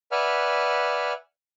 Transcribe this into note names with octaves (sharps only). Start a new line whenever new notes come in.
B4 D5 E5 F#5 G#5 F6